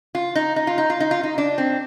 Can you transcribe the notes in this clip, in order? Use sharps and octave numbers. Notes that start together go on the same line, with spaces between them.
F4
D#4
D#4
F4
D#4
F4
D#4
F4
D#4
D4
C4